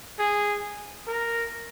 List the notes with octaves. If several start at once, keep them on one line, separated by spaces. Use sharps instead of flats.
G#4
A#4